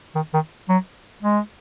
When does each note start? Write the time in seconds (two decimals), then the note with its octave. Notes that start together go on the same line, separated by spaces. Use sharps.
0.15 D#3
0.34 D#3
0.69 F#3
1.23 G#3